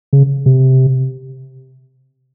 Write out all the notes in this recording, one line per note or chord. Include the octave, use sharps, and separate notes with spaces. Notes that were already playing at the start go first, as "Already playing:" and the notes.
C#3
C3